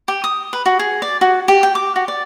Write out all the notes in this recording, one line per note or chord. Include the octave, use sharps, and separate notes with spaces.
G4
D#6
B4
F#4
G#4
D5
F#4
G4
G5
D6
F#4
D5